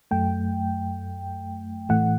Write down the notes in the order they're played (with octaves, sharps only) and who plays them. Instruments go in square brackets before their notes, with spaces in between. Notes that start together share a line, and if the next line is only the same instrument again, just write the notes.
[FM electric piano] F#2 F#3 A3 G5
A2 E3 A3 F#5